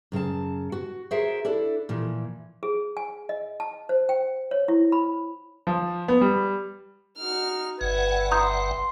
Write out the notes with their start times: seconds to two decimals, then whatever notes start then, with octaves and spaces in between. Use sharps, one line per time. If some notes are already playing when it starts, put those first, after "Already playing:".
0.12 F#2 C#3 A4 A5
0.72 F#4
1.11 F#4 G#4 A#4 C5 E5
1.45 D4 E4 A4 D5
1.89 A#2 E3 F3
2.63 G#4
2.97 G#5
3.29 D#5
3.60 A5
3.89 C5
4.09 G5
4.51 C#5
4.68 E4
4.92 B5
5.67 F3
6.08 B3
6.21 G3
7.18 D#4 F#4 F6
7.81 G1 B4 E5 F#5 G#6
8.32 A#5 C6 D#6 G6